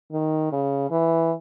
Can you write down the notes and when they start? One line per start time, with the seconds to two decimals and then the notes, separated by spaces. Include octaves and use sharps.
0.12 D#3
0.52 C#3
0.91 E3